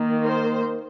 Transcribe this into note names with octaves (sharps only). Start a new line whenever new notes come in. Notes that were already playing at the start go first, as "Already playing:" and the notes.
Already playing: D#3 A#3
C5